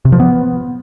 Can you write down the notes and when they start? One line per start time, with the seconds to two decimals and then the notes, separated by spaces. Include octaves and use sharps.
0.05 C3
0.12 F3
0.20 B3